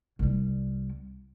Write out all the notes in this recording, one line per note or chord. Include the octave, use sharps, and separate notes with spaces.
C2 G3